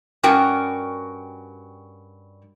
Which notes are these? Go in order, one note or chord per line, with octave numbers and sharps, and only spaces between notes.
G2 C#4 F#4 A#4 G5